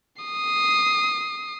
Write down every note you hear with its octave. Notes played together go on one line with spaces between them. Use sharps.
D#6 C7